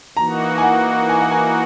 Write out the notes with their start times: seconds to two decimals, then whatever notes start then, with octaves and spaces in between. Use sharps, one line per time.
0.17 E3 A#3 D#4 F#4 A#5
0.58 G#5
0.63 F#5
1.09 G#5
1.21 F#5
1.31 G#5